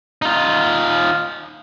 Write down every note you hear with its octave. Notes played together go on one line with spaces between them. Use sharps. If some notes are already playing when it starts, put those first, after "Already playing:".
D#4 F4